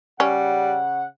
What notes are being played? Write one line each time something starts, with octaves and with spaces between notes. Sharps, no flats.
C#3 G3 C#4 F#5